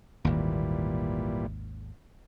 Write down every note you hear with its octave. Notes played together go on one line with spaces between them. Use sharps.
G#1 D#2 A#2 E3 G3